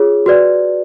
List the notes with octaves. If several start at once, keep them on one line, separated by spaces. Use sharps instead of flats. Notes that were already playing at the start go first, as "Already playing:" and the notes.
Already playing: F4 G#4 C#5
F#4 B4 D5